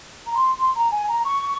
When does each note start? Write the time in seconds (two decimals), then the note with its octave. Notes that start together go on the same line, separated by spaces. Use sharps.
0.27 A#5
0.36 C6
0.59 C6
0.75 A#5
0.91 G#5
1.08 A#5
1.25 C#6